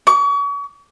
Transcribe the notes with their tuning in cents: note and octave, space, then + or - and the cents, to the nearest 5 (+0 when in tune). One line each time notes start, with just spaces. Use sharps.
C#6 +40